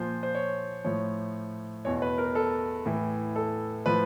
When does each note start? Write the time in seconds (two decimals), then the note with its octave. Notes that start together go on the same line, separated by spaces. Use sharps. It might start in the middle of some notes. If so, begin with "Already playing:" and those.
Already playing: A#2 F3 C5
0.23 C5
0.35 C#5
0.84 A2 F3 C#5
1.85 E2 B2 C#5
2.02 B4
2.18 A#4
2.35 A4
2.86 A2 E3
3.36 A4
3.86 A2 F3 B4